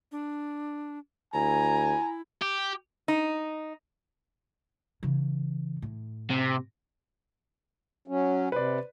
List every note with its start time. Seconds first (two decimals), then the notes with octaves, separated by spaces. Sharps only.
0.12 D4
1.34 D2 E4 G#5 A#5
2.42 G4
3.08 D#4
5.03 C#3 E3
5.82 A2
6.30 C3
8.08 F#3 C#4
8.52 C3 B4 C5 D5